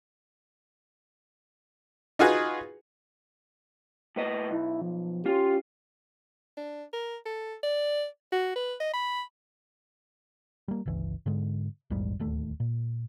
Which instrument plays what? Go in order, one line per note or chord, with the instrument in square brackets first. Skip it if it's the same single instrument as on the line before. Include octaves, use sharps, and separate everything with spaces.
[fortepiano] D#4 F4 F#4 G#4 B4
[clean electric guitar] A2 B4 D#5
[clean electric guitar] B1 [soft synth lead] E4
[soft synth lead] F3
[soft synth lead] C#4 [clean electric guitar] F4 [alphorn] G4
[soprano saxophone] D4
A#4
A4
D5
F#4
B4
D#5
B5
[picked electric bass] G3 A#3
G1 C#2 E3
G#2 D3 G#3
A#1 E2 G#2 G3
D1 D#2 A3
A#2